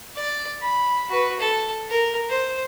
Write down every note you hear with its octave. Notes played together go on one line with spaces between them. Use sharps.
D5
B5
F#4 B4
A4
A#4
C5